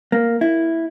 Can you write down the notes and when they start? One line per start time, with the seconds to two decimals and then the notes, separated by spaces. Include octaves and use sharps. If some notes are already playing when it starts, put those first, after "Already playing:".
0.12 A#3
0.41 E4